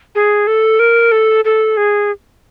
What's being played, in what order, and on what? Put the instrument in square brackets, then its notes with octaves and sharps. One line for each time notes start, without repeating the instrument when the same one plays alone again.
[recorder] G#4
A4
A#4
A4
A4
G#4